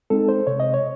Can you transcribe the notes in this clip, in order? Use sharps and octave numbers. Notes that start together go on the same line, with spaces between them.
G#3 C4 D#4 A4
C5
C3 C#5
D#5
C#5